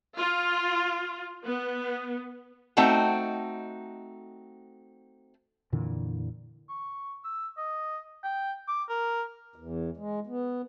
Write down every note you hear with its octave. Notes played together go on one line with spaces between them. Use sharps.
F4
B3
A3 C4 D#4 F#4 G5
F2 A#2 D3 E3
C#6
E6
D#5
G5
D6
A#4
E2
G#3
B3